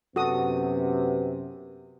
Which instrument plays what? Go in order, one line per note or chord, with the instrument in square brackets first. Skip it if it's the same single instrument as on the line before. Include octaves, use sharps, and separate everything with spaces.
[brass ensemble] F#2 C3 [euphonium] B3 [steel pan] F#4 A4 D#6